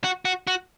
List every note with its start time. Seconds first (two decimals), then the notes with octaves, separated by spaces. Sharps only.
0.04 F#4
0.25 F#4
0.47 F#4